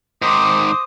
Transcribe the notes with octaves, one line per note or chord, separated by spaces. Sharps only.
G#2 D#3 C5 D6 D#6